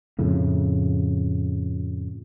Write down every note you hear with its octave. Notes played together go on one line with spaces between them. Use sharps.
F2 A2 C#3